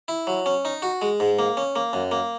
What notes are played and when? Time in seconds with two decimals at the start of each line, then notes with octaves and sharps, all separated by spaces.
0.08 E4
0.27 F#3
0.46 C#4
0.65 D#4
0.82 F#4
1.02 G#3
1.20 G#2
1.39 A#3
1.57 C#4
1.76 A#3
1.93 F#2
2.12 A#3